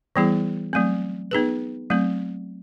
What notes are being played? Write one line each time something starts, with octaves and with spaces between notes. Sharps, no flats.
E3 G3 B3 E4 G#4
F#3 A3 C4
B3 D#4 G#4 B4
F#3 A3 C4